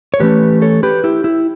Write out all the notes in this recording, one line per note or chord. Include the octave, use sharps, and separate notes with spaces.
C#5
A2 E3 A3 C#4 G4 B4
A4 C#5
G4 B4
E4 G4
E4